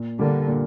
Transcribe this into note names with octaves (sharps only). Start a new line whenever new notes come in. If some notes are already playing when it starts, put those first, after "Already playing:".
Already playing: A#2
D3 G3 A#3 D4
A#2